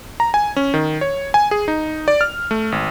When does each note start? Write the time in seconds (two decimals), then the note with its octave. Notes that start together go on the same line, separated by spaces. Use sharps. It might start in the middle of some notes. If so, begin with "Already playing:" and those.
0.20 A#5
0.34 G#5
0.56 C#4
0.74 D#3
1.01 C#5
1.34 G#5
1.51 G#4
1.68 D#4
2.08 D5
2.21 F6
2.51 A3
2.72 G#1